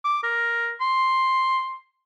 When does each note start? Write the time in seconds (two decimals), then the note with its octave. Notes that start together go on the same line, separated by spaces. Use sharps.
0.04 D6
0.24 A#4
0.81 C6